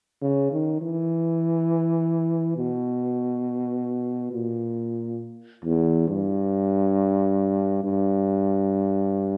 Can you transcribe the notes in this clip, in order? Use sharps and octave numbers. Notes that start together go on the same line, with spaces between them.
C#3
D#3
E3
B2
A#2
E2
G2
G2